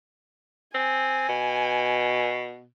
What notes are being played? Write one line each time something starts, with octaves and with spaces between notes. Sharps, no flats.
C4 G#5
B2